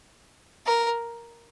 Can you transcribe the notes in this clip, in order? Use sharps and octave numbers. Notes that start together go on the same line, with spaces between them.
A#4